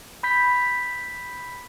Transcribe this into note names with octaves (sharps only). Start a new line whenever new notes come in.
B5 G6 B6